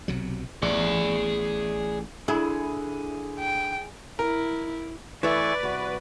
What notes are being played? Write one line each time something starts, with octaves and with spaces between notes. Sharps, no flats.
B1 C3 F#3
A1 G#4 D5
D3 E4 G#4
G5
E4 A#4
E3 A3 B4 D5 E5 G#5 C#6
C2 F#4